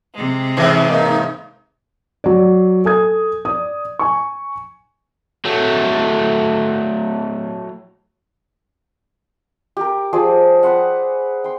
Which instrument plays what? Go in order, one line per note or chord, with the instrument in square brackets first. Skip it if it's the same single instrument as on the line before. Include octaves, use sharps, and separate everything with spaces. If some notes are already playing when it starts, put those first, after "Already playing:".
[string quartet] C3 G#3
[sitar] G#2 C#3 E3
[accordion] A#3 D#4
[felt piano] F#3 D5
A4 G#5 D#6 G#6
D5 D#6
G#5 C#6
[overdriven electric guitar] F#3 A3
[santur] G4 A#4
F3 G#4 D5 G5
B4 C5 F#5
G5 C6